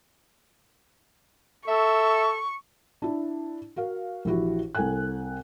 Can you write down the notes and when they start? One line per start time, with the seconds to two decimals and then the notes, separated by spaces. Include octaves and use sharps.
1.68 A4 E5 C#6
3.02 D4 E4
3.76 F#4 A#4 F5
4.25 A#1 E3 E4 F#4 G4
4.75 C2 C4 A4 G5 G#5 F#6